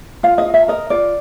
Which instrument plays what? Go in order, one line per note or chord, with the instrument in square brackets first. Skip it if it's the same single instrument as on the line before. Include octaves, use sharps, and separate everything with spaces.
[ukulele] F4 F5
D#5
F4
E5
A#4 D#5
F4 D5